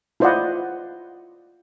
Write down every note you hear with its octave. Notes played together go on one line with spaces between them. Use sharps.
E4 F4 C5 D5 D#5 F#5